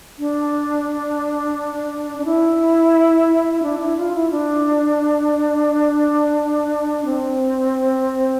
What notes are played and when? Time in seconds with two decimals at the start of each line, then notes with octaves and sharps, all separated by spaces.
0.19 D4
2.18 D4
2.25 E4
3.63 D4
3.79 E4
3.97 F4
4.14 E4
4.31 D4
7.05 C4